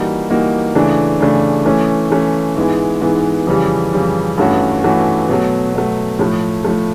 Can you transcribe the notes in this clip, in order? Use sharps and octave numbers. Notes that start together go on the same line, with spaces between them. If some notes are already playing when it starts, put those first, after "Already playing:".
Already playing: E3 G3 A#3 D#4 F#4
E3 G3 A#3 D#4 F#4
C#3 E3 A3 D4
C#3 E3 A3 D4
E3 A3 C#4
E3 A3 C#4
G#2 E3 G#3 B3 E4
G#2 E3 G#3 B3 E4
F2 C#3 E3 G3
F2 C#3 E3 G3
G2 E3 A3 C#4 F#4
G2 E3 A3 C#4 F#4
B2 F#3 A3
B2 F#3 A3
A2 F3 A3
A2 F3 A3